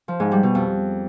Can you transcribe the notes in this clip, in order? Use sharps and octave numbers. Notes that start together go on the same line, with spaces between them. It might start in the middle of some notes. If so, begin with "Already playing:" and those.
F3
G#2
G3
B2
F2